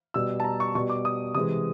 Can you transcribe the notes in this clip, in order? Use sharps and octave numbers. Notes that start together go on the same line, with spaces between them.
B2 G3 E6
A5
A#5
C#6
B2 G3 C#6
D6
D#6
C3 E3 G#3 D#6